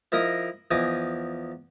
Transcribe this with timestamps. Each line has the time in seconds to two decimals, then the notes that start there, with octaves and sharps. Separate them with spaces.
0.12 F3 E4 A#4 D#5 D#6
0.71 E2 F3 D#5 G#5 D6